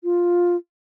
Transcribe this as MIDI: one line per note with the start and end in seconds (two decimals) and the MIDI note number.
0.04 0.56 65